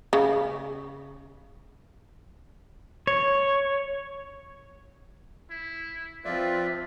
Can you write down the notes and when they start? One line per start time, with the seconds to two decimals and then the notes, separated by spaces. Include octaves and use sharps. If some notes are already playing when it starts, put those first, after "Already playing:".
0.13 C#3
3.07 C#5
5.51 E4
6.25 F3 C4 F4 B4 D5 E5